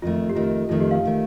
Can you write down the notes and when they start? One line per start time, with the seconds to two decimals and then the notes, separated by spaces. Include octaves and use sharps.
0.02 F2 D#3 A3 F4
0.29 G4
0.35 F2 D#3 A3 F4
0.69 F2 D#3 A3 F4
0.80 G4
0.91 F5
1.05 D#3 A3